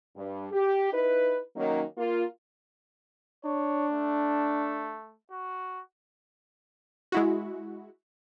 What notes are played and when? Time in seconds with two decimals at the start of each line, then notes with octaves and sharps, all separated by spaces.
0.16 G2
0.52 G4
0.92 D#4 E4 B4
1.56 D#3 F#3 A#3 C#4 D#4
1.97 A#3 F4
3.45 D4 C#5
3.91 A3
5.31 F#4
7.12 G#3 E4 F#4